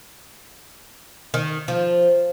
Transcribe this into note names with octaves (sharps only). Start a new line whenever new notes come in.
D#3
F3